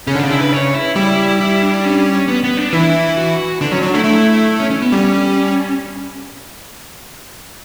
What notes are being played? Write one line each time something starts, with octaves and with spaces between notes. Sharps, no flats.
C#3 C#4
D3
C#3 D4
E4
B4
C#5
E4
G3 E4
E4
D4
C#4
B3
B3
D4
E3 E4
F#4
D3 D4
F#3 C#4
F#3 D4
A3 E4
A3 E4
C#4
C#4
B3
G3 C#4